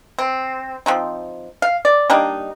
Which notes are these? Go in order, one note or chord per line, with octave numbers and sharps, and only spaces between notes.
C4
F3 C4 D#4
F5
D5
G3 A#3 D4 D#4